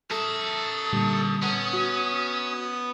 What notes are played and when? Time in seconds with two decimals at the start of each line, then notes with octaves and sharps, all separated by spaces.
0.11 A4 A#4 E5 D#6
0.93 A#2 D3 G3
1.43 B3 C#4
1.73 F#4